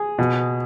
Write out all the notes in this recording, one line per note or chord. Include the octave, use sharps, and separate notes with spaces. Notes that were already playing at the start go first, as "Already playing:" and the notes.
Already playing: G#4
B2